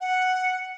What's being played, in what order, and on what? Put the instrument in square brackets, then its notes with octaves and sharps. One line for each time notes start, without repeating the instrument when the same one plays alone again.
[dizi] F#5